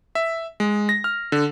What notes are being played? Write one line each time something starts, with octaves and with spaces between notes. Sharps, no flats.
E5
G#3
A#6
F6
D3